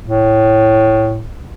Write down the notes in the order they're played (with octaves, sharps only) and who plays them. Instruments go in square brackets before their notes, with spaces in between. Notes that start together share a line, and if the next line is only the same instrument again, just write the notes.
[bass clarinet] A2